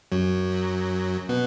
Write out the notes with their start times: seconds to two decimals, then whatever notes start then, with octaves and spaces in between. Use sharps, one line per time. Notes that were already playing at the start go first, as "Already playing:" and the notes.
0.12 F#2 F#3
1.29 B2 B3